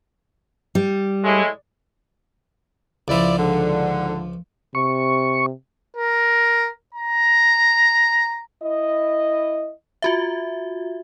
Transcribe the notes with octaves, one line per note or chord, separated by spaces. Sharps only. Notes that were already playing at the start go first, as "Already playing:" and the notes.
G3
A2 G#3 E4
C#2 F3 E4 D5
G#2 D3
C3 C#6
A#4
A#5
E4 D#5
F4 F#4 E5